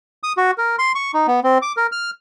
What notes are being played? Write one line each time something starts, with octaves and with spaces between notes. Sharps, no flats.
D#6
F#4
A#4
C6
C#6
D#4
B3
C4
D6
A#4
F6